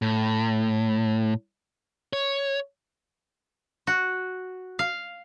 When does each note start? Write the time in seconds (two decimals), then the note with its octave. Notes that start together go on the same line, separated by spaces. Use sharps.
0.02 A2
2.13 C#5
3.87 F#4
4.79 F5